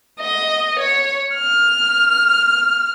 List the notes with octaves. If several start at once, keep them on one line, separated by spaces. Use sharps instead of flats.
D#5
C#5
F6